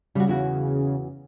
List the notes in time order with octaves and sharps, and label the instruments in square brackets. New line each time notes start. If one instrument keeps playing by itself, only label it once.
[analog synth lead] C#3 [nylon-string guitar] G3 F#4
[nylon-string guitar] E2 E4 F#4